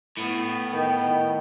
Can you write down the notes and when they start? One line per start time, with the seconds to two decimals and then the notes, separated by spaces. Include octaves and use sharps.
0.18 A2 B3
0.73 D#3 G5